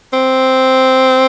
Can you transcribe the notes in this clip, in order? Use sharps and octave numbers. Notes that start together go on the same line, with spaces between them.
C4